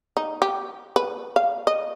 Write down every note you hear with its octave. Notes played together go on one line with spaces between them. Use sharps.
D#4
G4
B4
F5
D#5